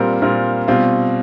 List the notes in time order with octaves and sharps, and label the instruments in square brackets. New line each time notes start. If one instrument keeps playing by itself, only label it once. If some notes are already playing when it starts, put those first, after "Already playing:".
Already playing: [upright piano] A#2 G3 C4 F4 A#4
A#2 G3 C4 F4 A#4
B2 G3 C4 F4